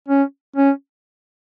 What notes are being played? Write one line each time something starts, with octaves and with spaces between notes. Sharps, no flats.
C#4
C#4